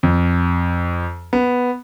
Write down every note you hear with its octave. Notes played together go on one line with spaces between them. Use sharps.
F2
B3